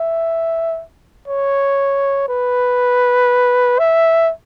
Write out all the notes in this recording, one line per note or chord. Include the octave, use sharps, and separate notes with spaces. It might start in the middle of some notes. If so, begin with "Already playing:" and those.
Already playing: E5
C#5
B4
E5